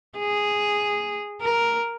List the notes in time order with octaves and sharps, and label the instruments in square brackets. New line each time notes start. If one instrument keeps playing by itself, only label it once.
[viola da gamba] G#4
A#4